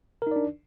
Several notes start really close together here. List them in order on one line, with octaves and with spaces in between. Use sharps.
A#4 D#4 D5 D4